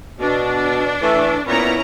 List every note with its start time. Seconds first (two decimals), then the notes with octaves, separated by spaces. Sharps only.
0.21 B2 D4
1.02 E3 A3
1.47 A#2 B3 C#4 E4 A#5